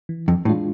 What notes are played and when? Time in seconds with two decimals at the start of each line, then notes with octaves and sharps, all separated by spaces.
0.09 E3
0.28 F2
0.45 A2 G#3 D4 F4